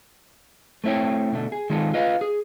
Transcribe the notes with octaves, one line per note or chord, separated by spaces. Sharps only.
A3 C4 E4 C#5 G5
B2 D3 A3
G#4
D#3 G#3 F4 G#4 A4
F4 B4 D#5 F5
G#4